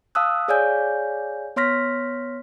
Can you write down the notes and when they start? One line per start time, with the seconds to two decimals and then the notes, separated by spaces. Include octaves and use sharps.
0.15 F5 A5 D#6 E6 F#6
0.48 G#4 C#5 D5 F5 G#5 G6
1.56 B3 C#5 C6 F6 A#6 B6